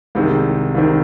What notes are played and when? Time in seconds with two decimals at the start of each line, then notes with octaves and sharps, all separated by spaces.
0.15 C2 C3 D#3 G#3
0.75 C2 C3 D#3